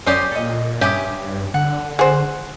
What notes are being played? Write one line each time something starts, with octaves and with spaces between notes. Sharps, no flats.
F#2 C#4 G4 C5 D5 D#6
A#2 A4 D#5
G2 C#4 G4 E5 G#5 D6 D#6
D3 F#5
G#4 C5 F#5